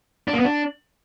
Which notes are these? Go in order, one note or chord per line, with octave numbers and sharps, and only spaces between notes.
D4
A#3
B3
D4